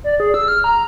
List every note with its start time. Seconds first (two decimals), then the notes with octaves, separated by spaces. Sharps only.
0.04 D5
0.20 G#4
0.34 E6
0.48 F6
0.64 A#5